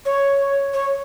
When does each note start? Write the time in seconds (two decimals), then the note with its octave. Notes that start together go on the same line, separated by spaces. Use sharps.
0.05 C#5
0.74 C#5